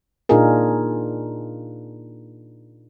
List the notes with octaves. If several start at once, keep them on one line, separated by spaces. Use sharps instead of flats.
A#2 D4 D#4 F4 G#4 A#4